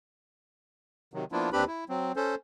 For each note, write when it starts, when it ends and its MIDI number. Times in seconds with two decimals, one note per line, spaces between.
1.14 1.25 48
1.14 1.25 51
1.14 1.25 54
1.32 1.50 53
1.32 1.50 58
1.32 1.50 59
1.32 1.50 62
1.32 1.50 64
1.32 1.50 65
1.53 1.64 39
1.53 1.64 60
1.53 1.64 62
1.53 1.64 67
1.53 1.64 71
1.53 1.64 83
1.67 1.84 64
1.89 2.12 54
1.89 2.12 60
2.16 2.35 61
2.16 2.35 69
2.16 2.35 72